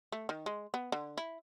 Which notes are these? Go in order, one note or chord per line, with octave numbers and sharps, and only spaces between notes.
A3
D#3
G#3
B3
D3
E4